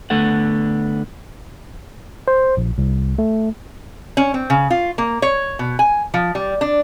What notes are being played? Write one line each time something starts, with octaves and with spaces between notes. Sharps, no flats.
D3 A3 B3 A4 F#5
C5
A#1
C2
A3
C#4
C4
C#3
F4
A#3
C#5
B2
G#5
F3
G3
D4